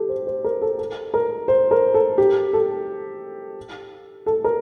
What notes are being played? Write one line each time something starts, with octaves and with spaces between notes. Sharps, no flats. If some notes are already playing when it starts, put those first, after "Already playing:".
Already playing: G4 A4
C5
C5
A#4
A4
A4
A#4
C5
A#4
A4
G4
A4
A4
A#4